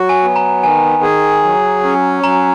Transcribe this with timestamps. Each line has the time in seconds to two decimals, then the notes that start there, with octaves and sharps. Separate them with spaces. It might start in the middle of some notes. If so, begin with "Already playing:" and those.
Already playing: F#3 F#4
0.09 G#5
0.23 B3
0.36 A#5
0.63 D#3 G#5
1.03 G#4
1.44 F#3
1.84 C#4
2.24 F#3 A#5